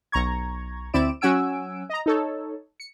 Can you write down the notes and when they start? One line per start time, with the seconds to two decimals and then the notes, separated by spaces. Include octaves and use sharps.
0.12 B1 A#5 C#6 G#6
0.93 D2 C4 E4 D5 D7 E7
1.21 F#3 C#4 F#5 G#5 E6 D7
1.90 D#5 A#5
2.06 D#4 A4 C#5
2.80 C#7